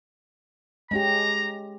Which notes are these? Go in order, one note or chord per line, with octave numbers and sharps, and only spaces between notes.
G#3 C#4 G4 A#5